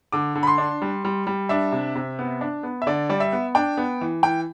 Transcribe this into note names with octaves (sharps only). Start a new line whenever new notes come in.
D3 D6
D3
B5
C6
D4
G3
G3
G3
D4 E5
C3
C3
B3
D4
B3
E5
D3 D5
G3 D5
E5
B3
D4 G5
B3
E3
E3 G5